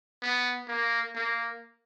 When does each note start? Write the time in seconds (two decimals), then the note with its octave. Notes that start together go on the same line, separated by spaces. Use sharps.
0.22 B3
0.68 A#3
1.15 A#3